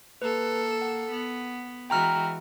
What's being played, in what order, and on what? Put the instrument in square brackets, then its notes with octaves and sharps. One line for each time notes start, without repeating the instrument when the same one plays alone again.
[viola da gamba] A#3 A4 [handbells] B4
[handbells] F#5
[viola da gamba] B3
[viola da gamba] E3 G#3 F#4 [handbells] G5 A#5 F6